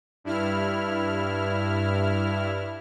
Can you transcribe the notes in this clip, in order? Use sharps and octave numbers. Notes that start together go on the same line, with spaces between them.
G2 E4 F6